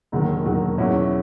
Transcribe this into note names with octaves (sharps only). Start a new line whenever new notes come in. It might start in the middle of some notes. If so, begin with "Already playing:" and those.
E1 D#2 D#3 F#3
E1 D#2 D#3 F#3
E2 B2 F#3 C#4 E4